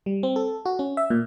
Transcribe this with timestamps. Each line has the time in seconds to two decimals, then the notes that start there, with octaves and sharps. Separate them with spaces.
0.06 G3
0.23 C4
0.36 A4
0.65 F#4
0.79 C#4
0.97 E5
1.10 A#2